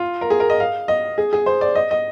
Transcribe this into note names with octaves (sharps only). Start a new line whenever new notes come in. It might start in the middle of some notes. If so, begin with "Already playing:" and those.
Already playing: F4
A#4
G#4
A#4
D#5
F5
D#5
G#4
G#4
C5
D5
D#5
D#5